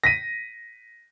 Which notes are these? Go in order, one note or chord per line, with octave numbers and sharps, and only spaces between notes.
A#6 B6 D#7